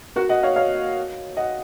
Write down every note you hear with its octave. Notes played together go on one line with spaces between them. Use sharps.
F#4 A#4
D#5 F#5
C#5 F5
C#5 F5
D#5 F#5